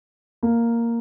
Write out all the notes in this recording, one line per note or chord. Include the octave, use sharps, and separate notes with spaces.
A#3